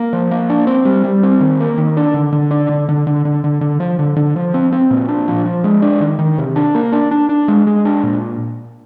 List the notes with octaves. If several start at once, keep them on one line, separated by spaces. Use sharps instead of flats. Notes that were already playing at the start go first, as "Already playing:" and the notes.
Already playing: A#3
F3
A#3
D4
C4
G3
G3
C4
D#3
A#3
D#3
D4
D3
D3
D4
D3
D3
D3
D3
D3
D3
F3
D3
D3
F3
C4
C4
A#2
D4
F3
F3
G#3
D4
D#3
D#3
C3
D4
A#3
D4
D4
D4
G#3
G#3
D4
A#2